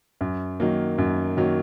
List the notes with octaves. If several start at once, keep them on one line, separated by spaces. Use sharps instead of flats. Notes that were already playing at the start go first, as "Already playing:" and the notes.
F#2
D#3 F#3 A#3
F#2
D#3 F#3 A#3